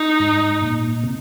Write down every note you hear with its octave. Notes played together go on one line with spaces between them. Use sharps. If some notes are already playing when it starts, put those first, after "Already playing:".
Already playing: D#4
G#2
A#2
C3